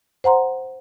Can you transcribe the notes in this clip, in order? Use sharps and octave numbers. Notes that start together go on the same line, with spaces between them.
C5 F#5 A#5 C6